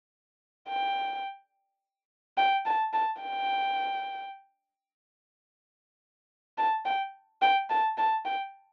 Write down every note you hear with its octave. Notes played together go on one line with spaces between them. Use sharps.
G5
G5
A5
A5
G5
A5
G5
G5
A5
A5
G5